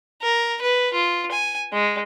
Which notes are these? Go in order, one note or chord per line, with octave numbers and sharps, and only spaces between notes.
A#4
B4
F4
G#5
G#3